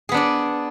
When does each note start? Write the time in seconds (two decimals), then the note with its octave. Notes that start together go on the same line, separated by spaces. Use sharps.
0.09 G#4
0.12 B3
0.14 D4
0.17 D5